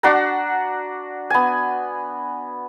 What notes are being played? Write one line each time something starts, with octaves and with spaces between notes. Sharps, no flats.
D4 F#4 F#5 A#5
B3 G#5